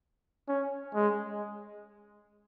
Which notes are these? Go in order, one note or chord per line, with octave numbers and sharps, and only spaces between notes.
C#4
G#3